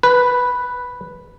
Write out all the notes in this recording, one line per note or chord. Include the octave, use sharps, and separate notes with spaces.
B4